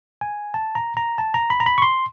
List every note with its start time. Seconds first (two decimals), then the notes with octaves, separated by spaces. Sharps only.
0.21 G#5
0.54 A5
0.75 A#5
0.97 A#5
1.18 A5
1.34 A#5
1.50 B5
1.60 A#5
1.66 B5
1.78 C#6
1.82 C6